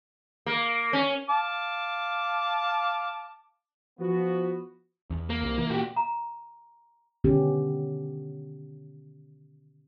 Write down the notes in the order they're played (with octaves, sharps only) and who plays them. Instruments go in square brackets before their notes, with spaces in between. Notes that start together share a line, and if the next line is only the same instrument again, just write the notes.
[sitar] A#3
C#4
[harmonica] F5 A5 D6
[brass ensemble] F3 B3 F#4
[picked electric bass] E2
[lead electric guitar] A#3
[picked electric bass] C2
E3
[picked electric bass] A#2 [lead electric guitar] F#4 G4
[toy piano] A#5
[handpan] B2 D3 D#3 B3 C#4 G4